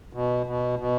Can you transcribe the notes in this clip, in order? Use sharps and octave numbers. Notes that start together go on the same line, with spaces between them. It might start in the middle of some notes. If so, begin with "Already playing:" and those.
B2
B2
B2